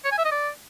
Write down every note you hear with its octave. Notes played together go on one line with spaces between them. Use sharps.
C#5
G#5
E5
D#5
D5